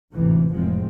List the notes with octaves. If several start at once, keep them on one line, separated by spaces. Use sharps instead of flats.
A1 D2 G#2 C3 E3
F1 F#2 A2 F3 G#3 C4